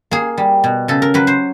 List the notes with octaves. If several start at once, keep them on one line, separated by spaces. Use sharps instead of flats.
A#3 G#4
G3
B2
C#3 A4
A#4
F#3 B4
C5